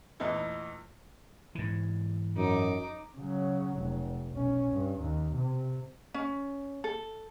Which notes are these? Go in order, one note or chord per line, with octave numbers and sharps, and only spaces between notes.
E2 A#2 A3 B3 D#4 E4
G#2 E3
F#2 D#4 D6
C#3 F#3
F1
B1 C#4
G2
D#2
C3
C#4
A4